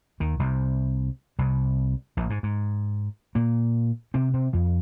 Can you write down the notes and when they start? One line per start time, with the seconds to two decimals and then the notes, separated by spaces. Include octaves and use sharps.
0.20 D#2 D#3
0.39 C2 C3
1.38 C2 C3
2.17 A#1 A#2
2.30 G#2
2.43 G#2
3.35 A#2 A#3
4.14 C3 C4
4.34 C3 C4
4.53 F2 F3